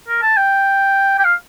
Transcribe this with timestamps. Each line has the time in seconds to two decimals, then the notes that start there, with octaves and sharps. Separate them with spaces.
0.08 A#4
0.22 A5
0.37 G5
1.19 G5
1.24 F5